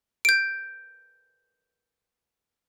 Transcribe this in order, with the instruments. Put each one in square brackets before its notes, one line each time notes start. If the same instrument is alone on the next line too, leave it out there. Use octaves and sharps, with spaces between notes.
[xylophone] G6 D7